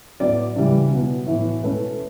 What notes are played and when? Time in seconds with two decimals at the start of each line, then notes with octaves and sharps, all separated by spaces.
0.20 A2 F#3 B3 D5
0.56 C#3 E3 G3
0.91 B2 F#3 B3
1.26 A2 E3 B3
1.62 B2 A3 C#4 B4